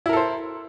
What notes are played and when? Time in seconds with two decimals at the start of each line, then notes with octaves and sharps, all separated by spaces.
0.06 E4
0.09 A#4
0.13 A4
0.17 C5